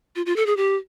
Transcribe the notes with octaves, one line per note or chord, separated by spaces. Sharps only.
F4
F4
A4
G#4
G4